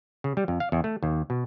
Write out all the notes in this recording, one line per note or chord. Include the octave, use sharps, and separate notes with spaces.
C#3
G3
F2
F5
E2
A3
D#2
B2